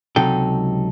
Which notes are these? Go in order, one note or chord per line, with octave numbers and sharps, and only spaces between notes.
C#2 C3 F#3 D#4 A4 G5